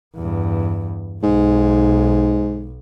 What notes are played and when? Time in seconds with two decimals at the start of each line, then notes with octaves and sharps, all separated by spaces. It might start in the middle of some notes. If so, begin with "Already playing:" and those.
0.15 E2 G2
1.23 B1 G#2